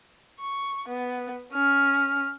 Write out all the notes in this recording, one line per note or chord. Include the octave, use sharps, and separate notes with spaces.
C#6
B3
C#4 F6